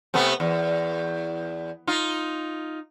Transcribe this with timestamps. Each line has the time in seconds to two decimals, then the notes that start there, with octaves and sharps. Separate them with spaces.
0.14 C3 A3 B3
0.40 E2
1.87 D#4 F4